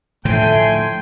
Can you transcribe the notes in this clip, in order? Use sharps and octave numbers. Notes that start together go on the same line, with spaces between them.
A2 D3 F3 A3 G5 G#5 C6